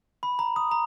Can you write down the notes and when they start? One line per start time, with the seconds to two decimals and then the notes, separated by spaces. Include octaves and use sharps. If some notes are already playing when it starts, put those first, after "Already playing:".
0.23 B5
0.39 A#5
0.56 D#6
0.71 A#5